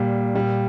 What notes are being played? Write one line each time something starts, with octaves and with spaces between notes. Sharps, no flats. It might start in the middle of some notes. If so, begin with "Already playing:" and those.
Already playing: A#2 G3
A#2 G3